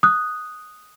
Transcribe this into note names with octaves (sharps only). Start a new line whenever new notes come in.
D#6 F#6